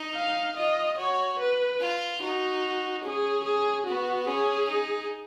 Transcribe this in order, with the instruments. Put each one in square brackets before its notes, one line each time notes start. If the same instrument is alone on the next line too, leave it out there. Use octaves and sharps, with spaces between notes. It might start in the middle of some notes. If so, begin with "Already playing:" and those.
Already playing: [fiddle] D#4
[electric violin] F5
[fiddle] F4 [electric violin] D#5
[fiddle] F#4 [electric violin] C#5
[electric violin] B4
[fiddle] F4
[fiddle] D#4 [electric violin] F#4
[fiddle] C#4 [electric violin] G#4
[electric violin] G#4
[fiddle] B3 [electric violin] F#4
[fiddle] C#4 [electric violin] G#4
[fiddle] D#4